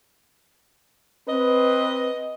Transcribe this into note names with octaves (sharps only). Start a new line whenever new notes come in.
C4 B4 D#5